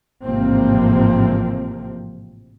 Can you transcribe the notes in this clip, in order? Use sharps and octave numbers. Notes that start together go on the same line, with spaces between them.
A1 G#2 C3 F3 A#3 C4